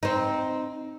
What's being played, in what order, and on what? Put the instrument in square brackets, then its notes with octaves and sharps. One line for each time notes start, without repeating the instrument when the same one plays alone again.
[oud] C4 D#4